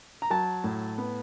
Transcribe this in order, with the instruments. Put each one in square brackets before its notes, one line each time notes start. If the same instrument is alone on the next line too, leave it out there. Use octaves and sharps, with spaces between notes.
[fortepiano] A#5
F#3 A5
A2
B3